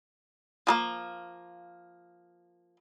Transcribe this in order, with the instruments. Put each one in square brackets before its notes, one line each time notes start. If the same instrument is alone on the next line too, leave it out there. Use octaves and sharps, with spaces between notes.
[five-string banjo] F3 G3 A#3